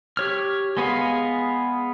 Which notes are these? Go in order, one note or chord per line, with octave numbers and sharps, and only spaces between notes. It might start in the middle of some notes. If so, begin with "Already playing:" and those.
G4 C#5 F6
G#3 B3 G#4 F5